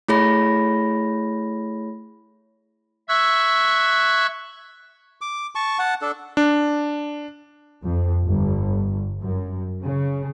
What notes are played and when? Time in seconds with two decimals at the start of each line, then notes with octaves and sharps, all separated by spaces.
0.08 A3 E4 G#4 C#5 B5 A#6
3.09 E5 C#6 E6 F#6 G#6
5.21 D6
5.55 A5 C#6
5.79 F#5 A5
6.02 D4 A4
6.37 D4
7.84 F2
8.24 G1
9.22 F#2
9.82 C#3